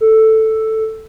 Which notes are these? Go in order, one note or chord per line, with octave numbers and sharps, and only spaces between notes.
A4